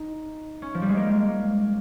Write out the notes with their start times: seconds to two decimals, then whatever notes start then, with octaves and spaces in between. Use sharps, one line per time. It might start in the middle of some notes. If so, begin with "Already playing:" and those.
Already playing: D#4
0.62 C#4
0.74 F3
0.82 G3
0.89 G#3
0.97 A#3